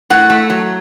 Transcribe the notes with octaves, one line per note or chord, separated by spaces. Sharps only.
A2 F#5
A3
F#3